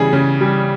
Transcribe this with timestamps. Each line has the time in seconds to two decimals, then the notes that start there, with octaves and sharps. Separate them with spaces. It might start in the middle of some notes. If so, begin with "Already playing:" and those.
Already playing: C#3 E3 G3 G#4
0.13 C#3
0.41 G3